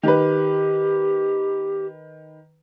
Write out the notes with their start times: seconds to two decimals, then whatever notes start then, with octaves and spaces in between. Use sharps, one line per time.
0.03 D#3 G4 B4